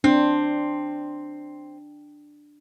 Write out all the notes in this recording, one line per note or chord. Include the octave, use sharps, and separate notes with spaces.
C4 D4